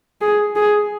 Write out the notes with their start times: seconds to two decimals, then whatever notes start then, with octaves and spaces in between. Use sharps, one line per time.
0.21 G#4
0.56 G#4